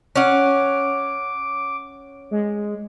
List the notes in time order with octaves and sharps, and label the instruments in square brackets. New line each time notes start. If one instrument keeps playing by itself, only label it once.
[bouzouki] C#4 F#5 [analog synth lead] D6
[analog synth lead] G#3